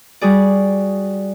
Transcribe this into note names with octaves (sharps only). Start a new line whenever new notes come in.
G3 F#4 G#4 D5